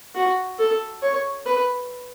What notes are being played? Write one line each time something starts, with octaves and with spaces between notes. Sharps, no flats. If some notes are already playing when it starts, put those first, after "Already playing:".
F#4
A4
C#5
B4